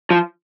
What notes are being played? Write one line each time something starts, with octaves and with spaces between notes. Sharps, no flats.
F3